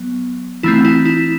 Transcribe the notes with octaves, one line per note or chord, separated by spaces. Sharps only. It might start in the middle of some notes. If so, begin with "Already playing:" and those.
Already playing: F#3 B3
E3 A3 C4 E4
E4
E4